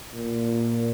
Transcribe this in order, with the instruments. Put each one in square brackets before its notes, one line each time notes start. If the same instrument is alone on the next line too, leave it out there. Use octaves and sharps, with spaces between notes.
[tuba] A#2